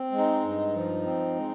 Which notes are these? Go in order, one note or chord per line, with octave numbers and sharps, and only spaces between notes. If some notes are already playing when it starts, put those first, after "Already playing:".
Already playing: C4
G#3
D#4
G2
F3
C4
G#3